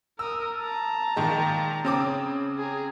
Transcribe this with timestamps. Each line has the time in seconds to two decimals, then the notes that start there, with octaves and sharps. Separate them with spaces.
0.19 A#4 D#6 E6
0.56 A5 A#5
1.16 A#2 D#3 G#3
1.85 C#3 C4 D6
2.58 G#4 A#5